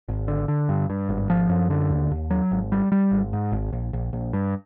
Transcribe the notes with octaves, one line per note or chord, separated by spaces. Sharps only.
G#1
D3
D3
G2
G2
G#1
F3
F#2
D3
D#2
D#2
F#3
G#1
G3
G3
G#1
G#2
G#1
A#1
A#1
A#1
G2